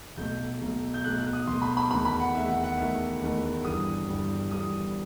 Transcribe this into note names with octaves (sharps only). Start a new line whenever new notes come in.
B1 B2 A3 G6
B1 B2 A3
G6
B1 B2 A3 F#6
F#6
D#6
B1 B2 A3 C6
B5
B5
E2 D#3 A3 B5
B5
F#5
E2 D#3 A3 E5
F#5
F#5
E2 D#3 A3 E5
E2 D#3 A3
G1 G2 E3 G3 D#6
G1 G2 E3 G3
G1 G2 E3 G3 D#6